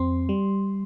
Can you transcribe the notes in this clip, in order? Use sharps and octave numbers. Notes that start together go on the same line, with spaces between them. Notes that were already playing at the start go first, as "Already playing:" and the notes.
Already playing: F2 C4 C6
G3